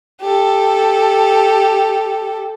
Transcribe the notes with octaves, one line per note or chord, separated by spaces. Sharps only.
G4 A4